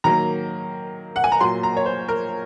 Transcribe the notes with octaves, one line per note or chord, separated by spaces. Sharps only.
D#3 F#3 A#3 A#5
F#5
G#5
A#5
A#2 F#3 A#3 C6
A#5
C#5
C5
A#4